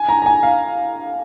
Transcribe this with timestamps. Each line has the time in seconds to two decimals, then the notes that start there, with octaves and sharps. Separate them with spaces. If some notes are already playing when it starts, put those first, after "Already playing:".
Already playing: G#5
0.09 A#5
0.22 A#5
0.26 G#5
0.43 F5